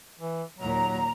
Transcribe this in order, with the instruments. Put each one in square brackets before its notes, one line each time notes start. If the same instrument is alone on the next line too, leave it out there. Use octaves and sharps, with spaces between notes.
[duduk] E3
[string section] D#2 A#2 [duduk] F#3 [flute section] A#5